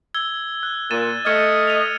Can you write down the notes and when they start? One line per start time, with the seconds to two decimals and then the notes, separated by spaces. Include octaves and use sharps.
0.14 E6 G#6 G7
0.63 F#6
0.91 A#2 A6 D#7 E7
1.26 A3 D#5 F6 G#6 C#7
1.67 D#7 F7